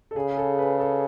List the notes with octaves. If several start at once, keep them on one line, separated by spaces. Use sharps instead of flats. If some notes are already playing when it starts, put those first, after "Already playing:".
A4
C#3 G#4
A4
B4
A4